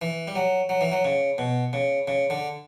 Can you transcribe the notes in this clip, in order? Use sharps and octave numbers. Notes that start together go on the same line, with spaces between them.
E3
G3
F#3
F#3
E3
F#3
C#3
B2
C#3
C#3
D3